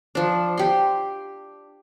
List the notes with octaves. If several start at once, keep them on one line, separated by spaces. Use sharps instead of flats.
F3 D4
G4 C6